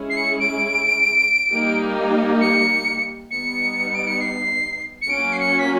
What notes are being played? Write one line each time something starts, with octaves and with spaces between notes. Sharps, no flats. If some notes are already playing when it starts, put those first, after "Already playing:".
Already playing: G#3 C#4 E4 G#4
C7
C#7
D7
G3 A#3 D#4 G4
C#7
G3 B3 D#4 C#7
D7
C#7
C7
C#7
F#3 A#3 C#4 F#4 D7
C7
C#7
B6